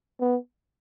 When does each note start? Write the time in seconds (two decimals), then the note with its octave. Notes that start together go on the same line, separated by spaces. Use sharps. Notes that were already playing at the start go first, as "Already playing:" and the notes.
0.20 B3